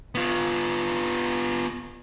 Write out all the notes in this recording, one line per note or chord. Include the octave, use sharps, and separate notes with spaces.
B3 F4